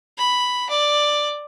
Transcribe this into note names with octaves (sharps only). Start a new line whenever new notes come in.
B5
D5